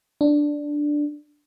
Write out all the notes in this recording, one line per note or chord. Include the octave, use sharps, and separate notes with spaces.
D4